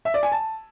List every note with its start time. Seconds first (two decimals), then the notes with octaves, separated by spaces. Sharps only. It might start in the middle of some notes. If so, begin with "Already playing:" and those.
0.05 E5
0.14 D5
0.23 G#5
0.32 A5